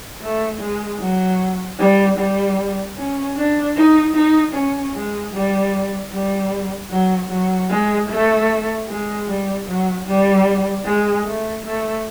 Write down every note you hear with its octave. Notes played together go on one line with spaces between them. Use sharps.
A3
G#3
F#3
G3
G3
C#4
D4
D#4
D#4
C#4
G#3
G3
G3
F#3
F#3
G#3
A3
G#3
G3
F#3
G3
G#3
A3
A3